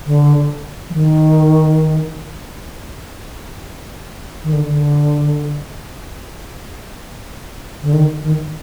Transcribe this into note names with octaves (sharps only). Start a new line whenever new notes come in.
D3
F3
D#3
D#3
D3
D3
D3
D#3
D#3